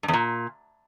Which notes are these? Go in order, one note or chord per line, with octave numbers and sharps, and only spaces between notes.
G2
E2
A#2